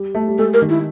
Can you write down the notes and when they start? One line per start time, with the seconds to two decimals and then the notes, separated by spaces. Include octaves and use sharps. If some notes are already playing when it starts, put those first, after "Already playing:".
Already playing: G3
0.15 A3
0.28 G3
0.38 G#3 A4
0.54 A#4
0.62 D#3
0.69 E4